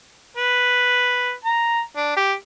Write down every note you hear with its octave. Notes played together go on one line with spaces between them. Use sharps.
B4
A#5
D4
G4